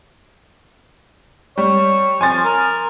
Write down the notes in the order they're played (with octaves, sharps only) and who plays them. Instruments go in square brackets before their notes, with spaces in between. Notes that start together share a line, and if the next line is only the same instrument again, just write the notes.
[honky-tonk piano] G3 [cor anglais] C#5
[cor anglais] F3 [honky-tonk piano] G#5 C6 A6
[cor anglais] A#4